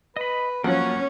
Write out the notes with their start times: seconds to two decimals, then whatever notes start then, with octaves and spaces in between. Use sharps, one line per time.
0.17 B4 D#5 B5
0.64 F3 F#3 A#3 C#4 F#5 F#6